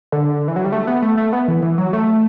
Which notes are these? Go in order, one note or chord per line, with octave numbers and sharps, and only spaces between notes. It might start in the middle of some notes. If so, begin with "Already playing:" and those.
D3
E3
F#3
G3
A3
B3
A3
A3
B3
E3
E3
F#3
A3